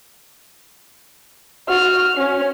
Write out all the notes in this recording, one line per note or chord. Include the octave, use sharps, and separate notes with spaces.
F#4 F6
C#4